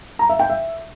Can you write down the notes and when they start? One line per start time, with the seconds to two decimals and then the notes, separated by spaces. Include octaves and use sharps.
0.19 A#5
0.29 E5
0.39 G5
0.50 E5